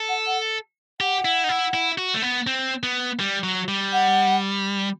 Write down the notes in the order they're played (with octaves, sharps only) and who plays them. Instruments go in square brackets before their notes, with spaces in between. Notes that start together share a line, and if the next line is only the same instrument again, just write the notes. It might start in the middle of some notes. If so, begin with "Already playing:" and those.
Already playing: [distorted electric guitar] A4
[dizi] F#5
F#5
[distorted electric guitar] G4 [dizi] F#5
[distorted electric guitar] E4
D#4
E4
E4
F#4
A3
B3
C4
B3
G3
F#3
G3
[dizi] F#5